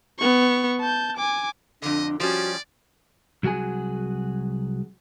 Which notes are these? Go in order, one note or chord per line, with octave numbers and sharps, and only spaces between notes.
B3 C#6
A5 G6
G#5 D6
F2 D3 D4 D#5
F3 G3 C#4 F#4 D5
C2 F#3 F#4 G#4 G#5